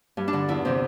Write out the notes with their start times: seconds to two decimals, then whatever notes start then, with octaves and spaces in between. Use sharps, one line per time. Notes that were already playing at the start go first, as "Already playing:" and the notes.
0.17 G2
0.28 D4
0.33 D3
0.48 E2 E4
0.65 C3 E3 C4